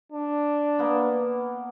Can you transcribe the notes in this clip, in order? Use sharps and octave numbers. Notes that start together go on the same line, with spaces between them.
D4
A#3 B3